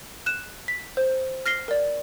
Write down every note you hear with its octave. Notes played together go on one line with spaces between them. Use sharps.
F#6 E7
B6
C5
F6 A#6 C7 G7
A#4 D5